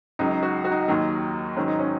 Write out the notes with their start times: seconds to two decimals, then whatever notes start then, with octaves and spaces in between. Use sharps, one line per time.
0.19 C#2 C#3 F#3 D#4
0.31 D#4
0.43 F#4
0.65 F#4
0.71 D#4
0.88 D#2 D#3 F#3
1.57 G#2 D#3 F#3 C#4
1.68 D#4
1.79 C#4